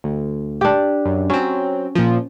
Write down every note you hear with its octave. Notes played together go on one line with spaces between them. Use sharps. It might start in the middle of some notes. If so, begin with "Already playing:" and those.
D2
D4 G4
F#2
F#3 C4 C#4
A#2 F3